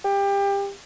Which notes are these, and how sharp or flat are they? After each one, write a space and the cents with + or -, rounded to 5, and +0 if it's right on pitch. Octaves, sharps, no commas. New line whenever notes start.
G4 +25